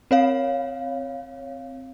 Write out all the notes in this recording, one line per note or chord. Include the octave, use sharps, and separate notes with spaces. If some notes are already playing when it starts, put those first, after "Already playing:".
C4 C#5 F5